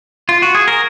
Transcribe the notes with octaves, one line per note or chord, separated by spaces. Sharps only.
F4
F#4
G#4
A#4